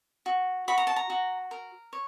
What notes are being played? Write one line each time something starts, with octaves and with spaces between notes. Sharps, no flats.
F#4
F#4 B5
A#5
A5
A#5
F#4
A#4
C#5